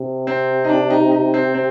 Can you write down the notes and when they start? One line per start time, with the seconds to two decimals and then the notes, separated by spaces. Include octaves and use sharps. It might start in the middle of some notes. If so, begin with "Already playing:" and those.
Already playing: C3
0.27 C4
0.64 D#4
0.69 D4
0.90 D#4
1.12 D#4
1.34 C4
1.54 C4